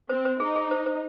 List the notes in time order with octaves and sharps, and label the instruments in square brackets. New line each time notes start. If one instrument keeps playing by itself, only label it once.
[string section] C4 [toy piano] C5
[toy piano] C5
[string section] D#4 [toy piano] G#4
[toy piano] G#4
C5
C5